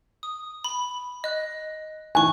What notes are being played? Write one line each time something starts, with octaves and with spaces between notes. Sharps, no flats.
D#6
B5
D#5 F#6
E3 G#5 C#6 F#6